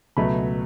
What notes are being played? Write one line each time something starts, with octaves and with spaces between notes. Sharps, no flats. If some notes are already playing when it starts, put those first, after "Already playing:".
C#2 B2 F#3 A3 B5